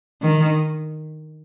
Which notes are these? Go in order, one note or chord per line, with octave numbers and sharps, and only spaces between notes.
D#3